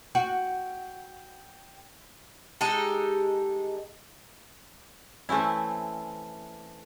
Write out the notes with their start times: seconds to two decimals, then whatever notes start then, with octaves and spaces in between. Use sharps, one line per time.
0.15 F#4 G5
2.61 G#3 D#4 G4 A4
5.29 E3 A3 C4 C#4 E4